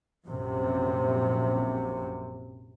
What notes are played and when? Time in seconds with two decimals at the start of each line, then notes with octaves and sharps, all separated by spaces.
0.27 A#1 F#2 C3